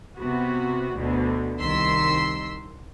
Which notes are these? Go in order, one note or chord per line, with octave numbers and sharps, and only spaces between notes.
C3 B3 F#4
D2 B2 D3
C2 D#3 C6 E6 B6